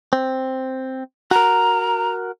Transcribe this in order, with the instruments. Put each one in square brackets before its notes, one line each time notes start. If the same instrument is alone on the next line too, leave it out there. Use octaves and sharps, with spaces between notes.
[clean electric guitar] C4
[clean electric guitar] F#4 A#4 [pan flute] A#5